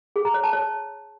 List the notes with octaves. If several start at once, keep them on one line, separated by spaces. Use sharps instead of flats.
G#4
A#5
C#5
A5
C#5